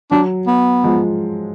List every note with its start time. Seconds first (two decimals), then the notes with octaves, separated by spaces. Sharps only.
0.11 F#3 D4
0.47 B3
0.84 F3 G#3